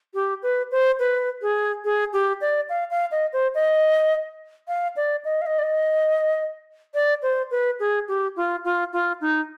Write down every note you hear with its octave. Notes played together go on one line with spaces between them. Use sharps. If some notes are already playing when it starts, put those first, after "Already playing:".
G4
B4
C5
B4
G#4
G#4
G4
D5
F5
F5
D#5
C5
D#5
F5
D5
D#5
F5
D#5
D5
D#5
D5
C5
B4
G#4
G4
F4
F4
F4
D#4